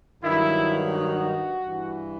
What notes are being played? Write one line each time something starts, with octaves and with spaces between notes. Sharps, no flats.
G2 D#3 F#3 E4
F#4
G2 E3